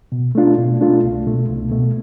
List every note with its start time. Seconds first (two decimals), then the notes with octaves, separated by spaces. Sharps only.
0.12 B2
0.35 A3 D4 F4
0.58 B2
0.81 A3 D4 F4
1.04 C2
1.26 B2 A3
1.49 C2
1.71 B2 A3